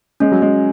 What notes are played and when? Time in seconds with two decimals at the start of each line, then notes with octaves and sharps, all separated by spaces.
0.20 G#3 C#4
0.32 F#3
0.42 G#3